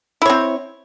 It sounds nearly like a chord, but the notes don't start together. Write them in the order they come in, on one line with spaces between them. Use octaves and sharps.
E4 C#5 C4